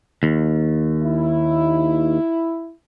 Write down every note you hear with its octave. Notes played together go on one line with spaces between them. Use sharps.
D#2
E4